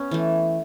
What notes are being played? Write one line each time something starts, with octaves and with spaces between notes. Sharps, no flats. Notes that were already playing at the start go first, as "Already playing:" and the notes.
Already playing: B3 C#4
E3 A3